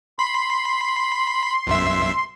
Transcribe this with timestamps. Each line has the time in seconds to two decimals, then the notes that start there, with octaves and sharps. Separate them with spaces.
0.19 B5 C6
1.67 B1 F#2 E5